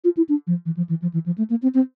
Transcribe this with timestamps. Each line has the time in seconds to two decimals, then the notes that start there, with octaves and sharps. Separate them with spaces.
0.04 F4
0.17 E4
0.29 D4
0.47 F3
0.66 E3
0.77 F3
0.89 E3
1.02 F3
1.14 E3
1.26 F3
1.38 A3
1.50 A#3
1.62 C4
1.74 C4